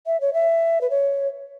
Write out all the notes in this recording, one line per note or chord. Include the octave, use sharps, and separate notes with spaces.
E5
C#5
E5
B4
C#5